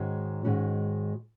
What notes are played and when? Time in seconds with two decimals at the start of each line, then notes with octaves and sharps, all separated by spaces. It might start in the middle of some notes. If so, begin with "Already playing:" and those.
Already playing: G#2 D#3 G#3 C#4 F#4
0.44 G#2 D#3 G#3 C#4 F#4